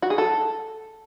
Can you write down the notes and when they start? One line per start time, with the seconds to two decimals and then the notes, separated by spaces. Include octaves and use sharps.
0.02 F#4
0.10 G#4
0.18 A4